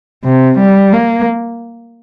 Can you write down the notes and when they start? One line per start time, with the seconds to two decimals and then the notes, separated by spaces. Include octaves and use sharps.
0.24 C3
0.58 G3
0.92 A#3